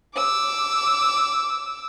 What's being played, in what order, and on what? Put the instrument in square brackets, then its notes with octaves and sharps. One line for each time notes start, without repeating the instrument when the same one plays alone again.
[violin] D6 E6